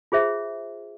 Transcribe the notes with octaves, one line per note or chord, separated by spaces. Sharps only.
F4 G#4 C5 E5